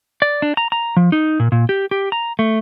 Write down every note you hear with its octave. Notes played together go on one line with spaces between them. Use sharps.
D5
D4
A#5
A#5
F3
D#4
A#2
A#2
G4
G4
A#5
A3